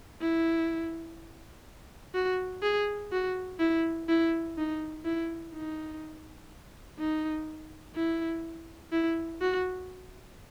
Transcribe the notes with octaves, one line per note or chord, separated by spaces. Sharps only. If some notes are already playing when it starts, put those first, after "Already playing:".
E4
F#4
G#4
F#4
E4
E4
D#4
E4
D#4
D#4
E4
E4
F#4